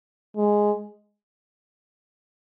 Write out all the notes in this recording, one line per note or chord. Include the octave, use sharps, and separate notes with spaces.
G#3